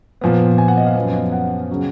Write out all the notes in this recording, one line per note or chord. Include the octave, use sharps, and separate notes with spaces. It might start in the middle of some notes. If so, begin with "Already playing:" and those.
A#2 F3 B3
G#5
F#5
D#5
F5
F#2 F3 B3
F#5
C#3 F#3 C#4